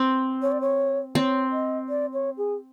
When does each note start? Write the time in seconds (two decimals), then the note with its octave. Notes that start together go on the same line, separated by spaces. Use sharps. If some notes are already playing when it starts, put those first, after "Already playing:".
Already playing: C4
0.42 C#5
0.52 D5
0.61 C#5
1.15 C4 D5
1.20 C#5
1.52 D#5
1.89 D5
2.13 C#5
2.38 G#4